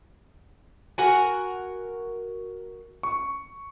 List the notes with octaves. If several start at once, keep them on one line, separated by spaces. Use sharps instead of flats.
F#4 A#4 G#5
C#6